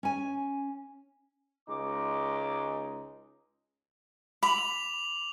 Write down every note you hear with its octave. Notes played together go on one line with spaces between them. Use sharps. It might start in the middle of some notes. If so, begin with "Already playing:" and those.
C#4 G#5
C#2 G#3 D#4 D6
B5 D6 F7 F#7